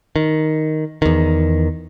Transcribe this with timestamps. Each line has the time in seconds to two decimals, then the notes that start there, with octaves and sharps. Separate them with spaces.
0.16 D#3
1.02 E2 D#3